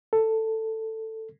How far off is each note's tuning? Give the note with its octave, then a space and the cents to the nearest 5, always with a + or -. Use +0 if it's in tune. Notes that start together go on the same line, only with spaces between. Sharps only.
A4 +10